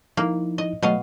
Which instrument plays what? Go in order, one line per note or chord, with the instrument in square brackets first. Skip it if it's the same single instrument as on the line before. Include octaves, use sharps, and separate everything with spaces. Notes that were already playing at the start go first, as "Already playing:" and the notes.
[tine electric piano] F3 D#4 E4 [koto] A#3
[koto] D#5
[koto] B2 D#5 F5 [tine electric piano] F#3 A3